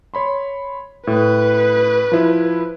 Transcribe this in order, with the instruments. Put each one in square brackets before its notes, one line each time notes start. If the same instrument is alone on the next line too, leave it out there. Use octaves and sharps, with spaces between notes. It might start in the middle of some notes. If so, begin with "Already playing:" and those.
[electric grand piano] C#5 B5 C6
[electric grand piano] A2 [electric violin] B4
[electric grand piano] F3 E4